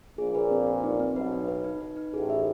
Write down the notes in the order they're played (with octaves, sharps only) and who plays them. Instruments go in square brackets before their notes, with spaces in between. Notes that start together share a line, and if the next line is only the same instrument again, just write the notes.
[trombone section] A#1 A#2 [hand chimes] G#4
[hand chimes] B4
C4
B4
D#4
C4
[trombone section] B1 B2 [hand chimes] B4
[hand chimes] D#4
B4
D#4
B4
D#4
[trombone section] A1 A2 [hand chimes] G#4
[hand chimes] E5